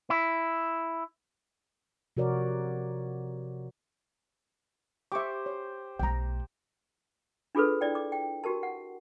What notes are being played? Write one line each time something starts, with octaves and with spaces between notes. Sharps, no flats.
E4
C3 F3 F#4 A#4 C#5 D5
G4 C5 E5 C#6 D6
C#5
B1 A3 G5 A#5
D4 F4 G#4 A4 B4
D4 E4 D5 G5
D6
G5
F#4 G4 A#4 A5
F#5